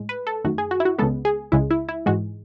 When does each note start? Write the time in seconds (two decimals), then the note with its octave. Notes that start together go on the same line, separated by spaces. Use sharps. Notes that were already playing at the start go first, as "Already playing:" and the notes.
Already playing: A2 G#3
0.09 B4
0.27 A4
0.44 F#2 D#3 A3 F#4
0.58 G#4
0.71 F#4
0.80 E4
0.85 F#4
0.98 C#2 C#3 G#3 B3 A4
1.25 G#4
1.52 C#2 C#3 G#3 E4
1.71 E4
1.89 E4
2.06 G#2 E3 G#3 F#4